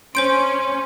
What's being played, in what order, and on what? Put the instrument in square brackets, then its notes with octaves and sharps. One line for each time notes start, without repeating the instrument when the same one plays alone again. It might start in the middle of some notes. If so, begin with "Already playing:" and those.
[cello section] C#4 [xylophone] C5 G6 D7 [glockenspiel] C6